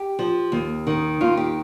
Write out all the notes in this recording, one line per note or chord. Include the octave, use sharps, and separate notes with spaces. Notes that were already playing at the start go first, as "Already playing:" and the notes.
Already playing: G4
F3
D#2
D#3
D#2 F4
G4